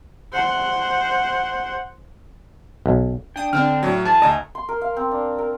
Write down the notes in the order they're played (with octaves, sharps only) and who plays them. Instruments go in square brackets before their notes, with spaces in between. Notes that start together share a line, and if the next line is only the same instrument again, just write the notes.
[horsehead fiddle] C5 F#5
[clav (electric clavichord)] B1
[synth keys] D4 D#6 [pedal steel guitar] G5
[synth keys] D3 C4 D4 [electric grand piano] F6
[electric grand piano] A2 F#3
[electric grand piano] E3 [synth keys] G#4 [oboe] A5
[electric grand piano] D2 A#5 [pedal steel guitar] D#5 E5 G#5
[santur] C6
A#4
F5
C4
D4
A#4